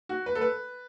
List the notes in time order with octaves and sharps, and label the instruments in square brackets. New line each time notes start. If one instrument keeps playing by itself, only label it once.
[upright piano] F#4
B4
A4
B4